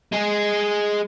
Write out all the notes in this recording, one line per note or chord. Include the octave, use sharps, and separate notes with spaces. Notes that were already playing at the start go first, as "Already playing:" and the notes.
G#3 G#4